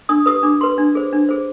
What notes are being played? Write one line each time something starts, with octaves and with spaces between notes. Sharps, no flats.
D4 D#6
G4 B4 D#6
D4 D6
G4 B4 C6
D4
G#4 C5
D4
G#4 C5